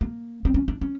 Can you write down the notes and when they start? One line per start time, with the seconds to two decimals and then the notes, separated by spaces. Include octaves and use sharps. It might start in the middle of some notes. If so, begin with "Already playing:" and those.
0.01 A#3
0.45 C4
0.54 C#4
0.68 D4
0.81 C#4